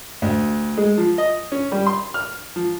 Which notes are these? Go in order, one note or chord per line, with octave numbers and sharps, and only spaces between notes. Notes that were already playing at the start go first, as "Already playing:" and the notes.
D2
G#3
F3
D#5
C#4
G3
C6
F6
F3